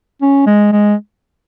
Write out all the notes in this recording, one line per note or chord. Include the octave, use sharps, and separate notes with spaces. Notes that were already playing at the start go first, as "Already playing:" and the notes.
C#4
G#3
G#3